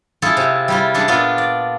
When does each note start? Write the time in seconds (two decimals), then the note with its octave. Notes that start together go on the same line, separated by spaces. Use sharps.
0.22 E4 F4 G#4 A4
0.37 C3
0.68 G3 E4 F4
0.94 G#3 D4 A4
1.08 A#2 B3 D4 F4
1.38 D5